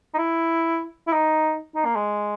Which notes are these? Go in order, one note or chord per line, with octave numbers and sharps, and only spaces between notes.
D#4
E4
E4
D#4
D#4
A#3
G#3